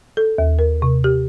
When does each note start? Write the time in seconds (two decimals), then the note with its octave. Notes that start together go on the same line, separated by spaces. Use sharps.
0.17 A4
0.38 D#2
0.59 A#4
0.82 C3
1.04 G4